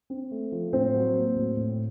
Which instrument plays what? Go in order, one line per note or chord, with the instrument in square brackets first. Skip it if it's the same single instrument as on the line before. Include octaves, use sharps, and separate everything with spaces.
[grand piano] C4
A3
F3
A2 C4 C5
F#3
A#3
A2
A2